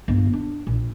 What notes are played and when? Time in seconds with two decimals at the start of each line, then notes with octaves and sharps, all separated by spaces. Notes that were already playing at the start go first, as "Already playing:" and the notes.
0.08 G1 A#3
0.33 D4
0.67 A#1